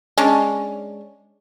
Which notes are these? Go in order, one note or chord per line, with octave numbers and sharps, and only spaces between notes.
G#3 C#4 D4